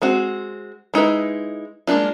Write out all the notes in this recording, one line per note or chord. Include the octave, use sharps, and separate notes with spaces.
G#3 C4 F#4
G#3 D#4 E4 B4
G#3 A#3 B3 D4 F4